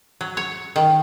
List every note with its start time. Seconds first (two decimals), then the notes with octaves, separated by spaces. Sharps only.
0.21 F#3
0.37 C#5
0.76 D#3